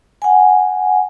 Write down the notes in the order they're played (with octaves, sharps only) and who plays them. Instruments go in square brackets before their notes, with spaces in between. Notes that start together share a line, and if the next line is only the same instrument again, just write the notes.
[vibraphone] F#5 G#5